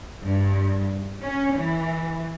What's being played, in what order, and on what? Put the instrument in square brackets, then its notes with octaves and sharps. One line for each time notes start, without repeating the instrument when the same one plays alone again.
[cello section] G2
C#4
E3